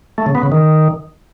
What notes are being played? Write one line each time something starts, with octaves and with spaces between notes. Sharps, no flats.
A3
C#3
B3
C#3
D#3